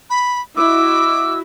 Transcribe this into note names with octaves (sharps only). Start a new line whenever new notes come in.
B5
E4 F#4 D#5 D6 E6